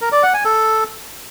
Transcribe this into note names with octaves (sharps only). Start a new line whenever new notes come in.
A#4
D5
F#5
G#5
A4